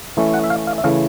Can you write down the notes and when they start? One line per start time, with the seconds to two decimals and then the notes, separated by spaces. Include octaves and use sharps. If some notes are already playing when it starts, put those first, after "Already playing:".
0.17 E3 A3 C#4
0.34 F#5
0.44 E5
0.50 F5
0.67 F5
0.78 E5
0.84 C#3 E3 A3 F5